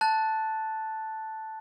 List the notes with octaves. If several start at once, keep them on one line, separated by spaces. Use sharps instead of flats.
A5 F#6 A6